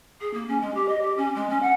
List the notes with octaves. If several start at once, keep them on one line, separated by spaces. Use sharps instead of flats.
G#4
A#3
C#4
G#3
G4
D#5
G4
C#4
G#3
C#4
F#5